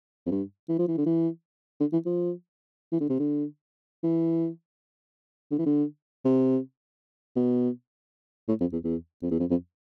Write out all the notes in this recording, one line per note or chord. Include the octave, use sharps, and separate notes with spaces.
F2
G2
E3
F3
E3
D3
E3
D3
E3
F3
E3
D3
C3
D3
E3
D3
E3
D3
C3
B2
A2
F2
E2
E2
F2
E2
F2
F2